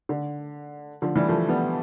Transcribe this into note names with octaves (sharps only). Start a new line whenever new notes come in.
D3
D3 F3
E3 G3
F3 A3
G3 B3